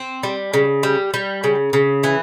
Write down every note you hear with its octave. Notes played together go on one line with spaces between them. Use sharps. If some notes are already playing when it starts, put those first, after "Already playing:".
Already playing: C4
G3
C#3
G3
G3
C#3
C#3
E3